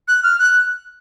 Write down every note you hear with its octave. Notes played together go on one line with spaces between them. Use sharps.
F#6
F6
F#6